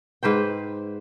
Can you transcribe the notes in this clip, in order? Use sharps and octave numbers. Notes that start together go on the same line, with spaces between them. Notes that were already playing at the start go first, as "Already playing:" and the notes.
G#2 B4 C5 G5